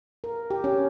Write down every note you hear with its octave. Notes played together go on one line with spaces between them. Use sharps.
A#4
G4
C#4